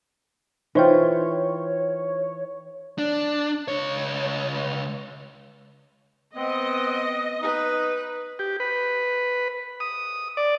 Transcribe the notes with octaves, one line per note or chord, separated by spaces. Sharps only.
E3 D#4 F4 C5 C#5 G5
D4
C#2 C#5
B3 C4 D#5
D#4 B4
G4
B4
D#6
D5